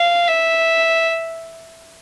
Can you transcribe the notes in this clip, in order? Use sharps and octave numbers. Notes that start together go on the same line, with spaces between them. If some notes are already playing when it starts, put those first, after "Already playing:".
Already playing: F5
E5